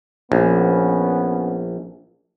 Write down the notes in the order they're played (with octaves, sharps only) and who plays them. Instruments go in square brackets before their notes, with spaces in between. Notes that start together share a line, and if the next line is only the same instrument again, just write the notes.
[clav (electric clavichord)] A#1 [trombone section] B3 C#4